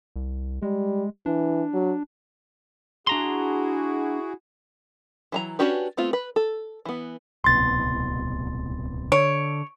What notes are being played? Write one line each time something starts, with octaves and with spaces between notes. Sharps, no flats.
C2
G3 G#3
E3 D4
F#3
D4 E4 F#4 G#4 A#5 C6
E3 F#3 A#5
C#4 D4 F#4 G4 B4
A3 B3 C4 F4
B4
A4
E3 B3
D1 C2 B2 C6 A6
D3 C#5 D7